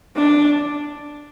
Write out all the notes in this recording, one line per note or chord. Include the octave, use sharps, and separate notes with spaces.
D4